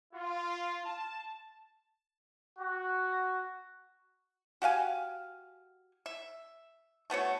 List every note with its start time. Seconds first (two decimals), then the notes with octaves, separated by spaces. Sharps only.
0.13 F4
0.85 A5
2.59 F#4
4.62 F#4 G4 F5 G#5
6.06 E5
7.10 A3 B3 F#4 C#5